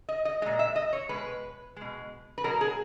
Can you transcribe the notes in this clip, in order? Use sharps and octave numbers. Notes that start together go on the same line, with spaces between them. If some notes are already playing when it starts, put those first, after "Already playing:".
D#5
D#5
A#2 G#3 D#5
E5
D#5
C#5
B2 G#3 B4
B2 G#3
B4
B2 F#3 A#4
G#4